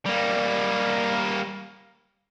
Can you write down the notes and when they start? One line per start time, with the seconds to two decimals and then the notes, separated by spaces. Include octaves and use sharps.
0.06 G3 A#3